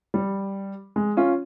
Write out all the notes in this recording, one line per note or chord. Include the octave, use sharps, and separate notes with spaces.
G3
G#3
C#4 F4